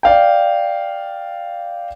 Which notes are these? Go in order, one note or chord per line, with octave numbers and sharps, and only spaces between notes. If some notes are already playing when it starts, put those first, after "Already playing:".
D5 F5 G5